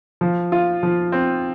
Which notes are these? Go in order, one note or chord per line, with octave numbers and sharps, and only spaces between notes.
F3
F4
F3
C4